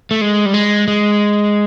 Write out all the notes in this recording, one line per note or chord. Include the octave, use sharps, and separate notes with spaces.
A3
G#3
G3
G#3
G#3